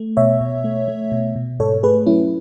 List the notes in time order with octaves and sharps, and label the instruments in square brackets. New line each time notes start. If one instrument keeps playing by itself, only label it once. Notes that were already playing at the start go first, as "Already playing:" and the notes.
Already playing: [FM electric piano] A3
B2 C#5 E5
B2
A3
A3
B2
B2
G#2 A4 C#5
A3 G#4 B4
F#3 C#4 E4